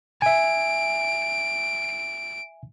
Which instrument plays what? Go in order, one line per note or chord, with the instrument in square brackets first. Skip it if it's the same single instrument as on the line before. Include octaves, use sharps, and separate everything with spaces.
[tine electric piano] E5 G#5 [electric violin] D7